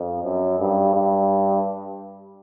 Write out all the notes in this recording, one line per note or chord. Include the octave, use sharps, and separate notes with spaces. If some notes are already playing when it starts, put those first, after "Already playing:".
Already playing: F2
F#2
G2
G2